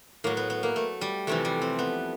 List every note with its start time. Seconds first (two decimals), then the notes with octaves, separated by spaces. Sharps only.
0.24 A2 F#3 A#3
0.37 B3
0.50 B3
0.63 A#3
0.76 A3
1.01 G3
1.27 F2 C3 E3 A3
1.45 G3
1.62 C4
1.79 B3